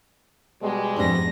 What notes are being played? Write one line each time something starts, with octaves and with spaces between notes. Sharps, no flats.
B2 G3 G#3
F2 G#2 D4 G4 A#6